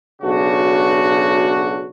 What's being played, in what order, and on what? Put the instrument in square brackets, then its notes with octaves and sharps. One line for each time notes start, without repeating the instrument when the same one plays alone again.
[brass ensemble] B1 C#3 D4 F#4